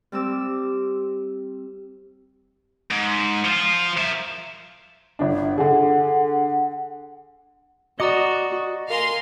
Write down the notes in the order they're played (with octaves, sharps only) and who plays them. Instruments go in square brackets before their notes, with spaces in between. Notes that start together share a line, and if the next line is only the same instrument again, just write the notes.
[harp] G3 C4 D6 E6
[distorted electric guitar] G#2
F3 F4
A#4 E5
[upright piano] G1 D4
[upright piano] D3 G#4 [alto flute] F#5
[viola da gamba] F#4 [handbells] D5 A#5 C#7 [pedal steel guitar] D#5 D6 D#6
[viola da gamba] A#4 [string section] F5 G#5 C6